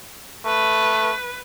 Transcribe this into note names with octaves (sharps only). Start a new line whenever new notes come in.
A3 B4